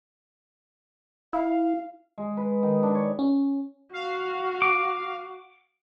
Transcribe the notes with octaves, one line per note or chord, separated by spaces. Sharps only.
E4 F5
G#3
B4
D#3
D4
C#5
C#4
F#4 F5
D6